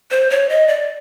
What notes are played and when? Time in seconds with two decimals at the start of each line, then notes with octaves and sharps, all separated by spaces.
0.11 C5
0.30 C#5
0.49 D#5
0.68 D5